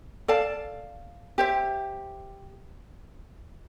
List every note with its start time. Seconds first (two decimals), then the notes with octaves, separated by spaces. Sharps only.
0.28 A4 D5 F5 A5
1.38 G4 C5 E5